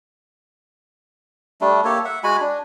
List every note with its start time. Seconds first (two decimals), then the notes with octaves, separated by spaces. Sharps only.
1.61 G3 A3 D4
1.85 A#3 G4 A4 C#5
2.05 E5 F#5
2.23 G#3 F#4 G#5 B5
2.41 D4